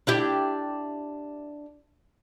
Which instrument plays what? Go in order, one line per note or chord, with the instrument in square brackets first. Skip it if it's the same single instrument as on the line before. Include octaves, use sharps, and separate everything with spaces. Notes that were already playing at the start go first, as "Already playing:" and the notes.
[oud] D4 E4 G4